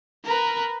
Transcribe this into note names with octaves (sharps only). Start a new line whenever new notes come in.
A#4 B4